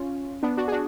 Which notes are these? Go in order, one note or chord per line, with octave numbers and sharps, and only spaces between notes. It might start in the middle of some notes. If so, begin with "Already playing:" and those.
Already playing: C#4 F4
B3 D4
D4 F#4
G#4
D4 F#4